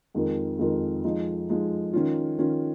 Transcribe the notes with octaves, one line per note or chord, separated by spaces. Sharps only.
F2 D#3 G#3 F4 A#4
F2 D#3 G#3 F4 A#4
F3 G#3 D#4
F3 G#3 D#4
D#3 C#4 F4
D#3 C#4 F4